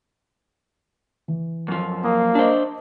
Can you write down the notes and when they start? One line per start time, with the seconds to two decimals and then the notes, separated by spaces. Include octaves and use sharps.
1.28 E3
1.68 F#2 F3
2.04 A#3 D#6
2.35 D4 C5 D#5 A5